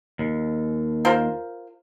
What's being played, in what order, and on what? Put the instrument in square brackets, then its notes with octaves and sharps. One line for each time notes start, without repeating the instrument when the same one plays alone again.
[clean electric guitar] D#2
[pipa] F4 A#4 C5